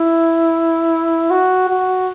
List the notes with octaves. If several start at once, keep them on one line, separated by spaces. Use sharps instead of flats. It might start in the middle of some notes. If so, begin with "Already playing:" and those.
Already playing: E4
F#4
F#4